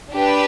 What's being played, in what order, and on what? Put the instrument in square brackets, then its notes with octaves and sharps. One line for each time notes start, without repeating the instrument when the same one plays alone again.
[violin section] D4 G4 B4